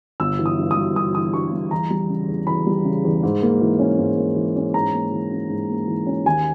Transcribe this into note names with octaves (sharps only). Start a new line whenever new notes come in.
G1 E6
E3
D#6
G2
D#6
G3
G1 D#6
E3 D#6
G2 C#6
G3
E2 A#5
G3
C#3
E2
E2 B5
G3
C#3
E2
G#2
A#3
E3
C#4
G#2
A#3
E3
C#4
G#2 A#5
A#3
E3
C#4
G#2
A#3
E3
C#4
D#2 G#5